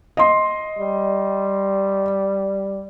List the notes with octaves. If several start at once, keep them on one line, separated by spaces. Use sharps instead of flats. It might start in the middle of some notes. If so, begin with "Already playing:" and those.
D#5 C6
G3